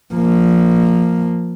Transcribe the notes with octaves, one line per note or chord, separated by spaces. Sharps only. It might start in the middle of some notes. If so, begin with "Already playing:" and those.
F3 A#3